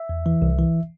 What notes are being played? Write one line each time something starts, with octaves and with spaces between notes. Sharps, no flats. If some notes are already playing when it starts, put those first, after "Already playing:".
Already playing: E5
E2
E3
C2
E3